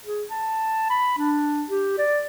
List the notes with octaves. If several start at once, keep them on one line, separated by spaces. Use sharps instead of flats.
G#4
A5
B5
D4
G4
D5